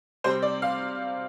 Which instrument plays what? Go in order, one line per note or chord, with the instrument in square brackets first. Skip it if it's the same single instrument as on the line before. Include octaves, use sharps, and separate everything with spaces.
[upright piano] C3 G3 C4 C5
D5
F5